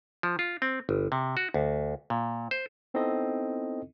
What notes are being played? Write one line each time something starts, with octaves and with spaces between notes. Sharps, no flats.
F3
F4
C4
G1
C3
F#4
D2
A#2
C5
B3 C4 D#4 E4 A4 D#5